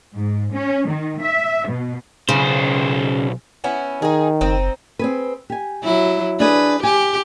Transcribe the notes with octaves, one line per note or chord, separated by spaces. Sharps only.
G#2
C#4
D#3
E5
B2
B1 C#3 C5
B3 C#4 E4
D#3 D#4 G#4
F#1 C4 D#4 C5
C4 G#4 B4
G4 G#5
F#3 E4
D4 G#4 A4 B4
G4 G#5